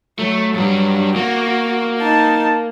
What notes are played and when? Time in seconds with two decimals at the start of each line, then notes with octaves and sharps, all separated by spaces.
0.19 F#3 A3
0.54 G2 F#3 G3
1.16 A#3 F#4
1.99 D#4 A5